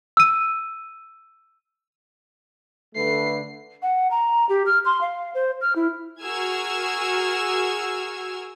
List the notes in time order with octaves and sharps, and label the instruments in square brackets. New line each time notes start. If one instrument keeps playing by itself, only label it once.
[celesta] E6 D#7
[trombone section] D3 A3 B4 [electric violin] C7
[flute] F#5
A#5
G4
F6
C6
F5
C5
F6
E4
[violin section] F#4 G#4 A#4 E6 F6 G#6